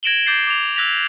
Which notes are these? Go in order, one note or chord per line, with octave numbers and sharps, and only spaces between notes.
G#6 A#6 D7 E7 F#7 G7
D6 G6 A6 C7
D6 F7
E6 F#6 G#6 A#6 B6 F7